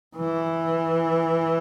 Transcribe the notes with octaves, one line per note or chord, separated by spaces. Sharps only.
E3